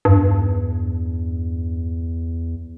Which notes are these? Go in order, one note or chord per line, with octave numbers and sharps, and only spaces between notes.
E2 G2